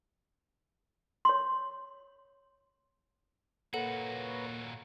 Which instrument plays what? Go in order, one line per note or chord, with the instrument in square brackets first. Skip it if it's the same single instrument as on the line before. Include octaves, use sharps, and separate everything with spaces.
[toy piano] C#5 C6
[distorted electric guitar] A#2 F#4 [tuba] A#3 [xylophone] A4 F#5 [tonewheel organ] B4 C#5 A#5